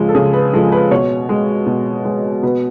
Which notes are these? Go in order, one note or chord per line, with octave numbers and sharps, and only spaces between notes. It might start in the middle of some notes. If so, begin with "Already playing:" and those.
Already playing: C#3 F3 G#3 G#4
A4
C#3 G#4
B4
F3 G#3 A4
B4
B2 C#5
G#3
B2
G#3
B2 B4